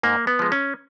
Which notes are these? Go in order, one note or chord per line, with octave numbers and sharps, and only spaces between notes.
G#2 A#3
B3
F3 G#3
C#4